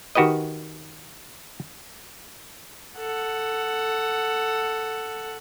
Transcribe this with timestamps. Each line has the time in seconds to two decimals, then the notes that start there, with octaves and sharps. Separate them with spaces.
0.15 D#3 F#4 G4 B4 D#5
2.97 A4 F#5